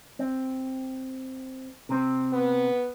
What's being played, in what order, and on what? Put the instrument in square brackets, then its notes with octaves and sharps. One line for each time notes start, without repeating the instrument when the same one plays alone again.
[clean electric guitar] C4
C3 C4
[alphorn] B3